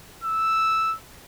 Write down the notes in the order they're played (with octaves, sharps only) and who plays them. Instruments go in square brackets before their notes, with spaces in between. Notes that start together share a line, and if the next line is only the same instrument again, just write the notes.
[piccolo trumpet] E6